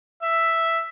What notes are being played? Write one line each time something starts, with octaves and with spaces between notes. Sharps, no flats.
E5